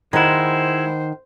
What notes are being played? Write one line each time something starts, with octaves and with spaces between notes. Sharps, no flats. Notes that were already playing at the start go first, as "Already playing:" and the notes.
D#3 G#3 E4 C5 F#5